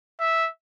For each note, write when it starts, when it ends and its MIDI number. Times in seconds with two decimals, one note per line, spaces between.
0.20 0.49 76